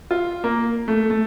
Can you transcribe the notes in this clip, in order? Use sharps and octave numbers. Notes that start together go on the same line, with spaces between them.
F4
A#3
A3
A3